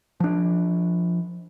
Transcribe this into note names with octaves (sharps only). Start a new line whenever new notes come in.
F3 D4